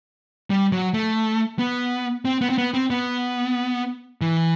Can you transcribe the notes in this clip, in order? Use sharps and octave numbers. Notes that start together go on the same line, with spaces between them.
G3
F#3
A3
B3
C4
B3
C4
B3
C4
B3
E3